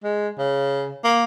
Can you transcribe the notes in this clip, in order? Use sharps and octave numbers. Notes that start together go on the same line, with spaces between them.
G#3
C#3
A#3